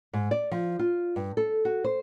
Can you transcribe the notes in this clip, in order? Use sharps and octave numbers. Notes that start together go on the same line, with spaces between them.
G#2
D5
F3
F4
G2
A4
F#4
C5